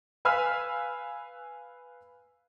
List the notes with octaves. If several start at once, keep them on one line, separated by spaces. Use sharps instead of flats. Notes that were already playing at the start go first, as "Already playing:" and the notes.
B4 F5 G#5 B5 E6 F6